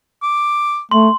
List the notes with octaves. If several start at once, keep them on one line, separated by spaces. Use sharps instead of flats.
D6
A3 C6